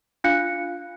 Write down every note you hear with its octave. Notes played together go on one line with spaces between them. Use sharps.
D4 F4 F5 F#6 C#7